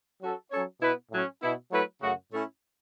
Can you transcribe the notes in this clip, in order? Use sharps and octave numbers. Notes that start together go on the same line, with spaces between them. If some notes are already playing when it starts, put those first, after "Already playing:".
F#3 C#4 F#4 A4
F#3 C#4 A4 C#5
B2 B3 E4 B4
A2 F#3 C#4
B2 B3 E4
F#3 A3 E4 B4
F#2 C#3 A3 F#4
A2 A3 C#4 E4